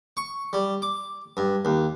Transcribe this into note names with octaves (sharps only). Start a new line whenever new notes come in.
C#6
G3
D6
G2
D#2